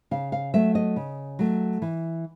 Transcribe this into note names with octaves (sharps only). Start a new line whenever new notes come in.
C#3 F5
F5
F#3 A3 E5
D#5
C#3
F#3 A3
E3